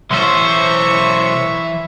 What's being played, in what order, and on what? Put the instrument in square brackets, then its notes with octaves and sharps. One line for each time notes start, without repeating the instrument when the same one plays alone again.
[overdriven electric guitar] B1 C5 [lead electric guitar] E3 C6 [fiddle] C#5 C#6 [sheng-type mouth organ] E5